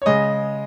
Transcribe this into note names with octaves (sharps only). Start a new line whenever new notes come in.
C#5
C#3 G#3 D#5